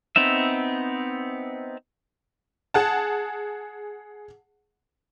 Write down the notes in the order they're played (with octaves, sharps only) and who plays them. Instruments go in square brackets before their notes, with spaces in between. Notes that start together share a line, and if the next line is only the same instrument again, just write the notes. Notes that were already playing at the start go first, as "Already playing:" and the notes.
[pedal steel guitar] B3 C4 D#4 E5
[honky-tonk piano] G#4 F#5 A5